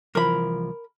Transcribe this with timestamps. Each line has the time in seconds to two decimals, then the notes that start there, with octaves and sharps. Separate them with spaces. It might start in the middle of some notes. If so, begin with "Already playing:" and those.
0.15 C2 E3 F3 A#4 B5